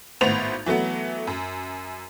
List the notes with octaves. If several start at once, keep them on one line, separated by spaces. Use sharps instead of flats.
G#1 A2 B3 C5 A6 F7
E3 F#3 A3 B3
F#2